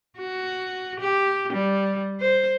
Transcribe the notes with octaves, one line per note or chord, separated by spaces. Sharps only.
F#4
G4
G3
C5